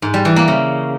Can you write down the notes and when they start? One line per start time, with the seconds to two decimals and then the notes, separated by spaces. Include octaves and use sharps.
0.02 G#2
0.14 G3
0.25 E3
0.36 A#3
0.48 C#3